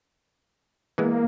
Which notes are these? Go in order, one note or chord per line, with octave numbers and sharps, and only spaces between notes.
E3 G#3 A#3 B3